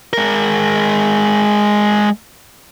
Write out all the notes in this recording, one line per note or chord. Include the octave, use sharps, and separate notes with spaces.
G#3 A#4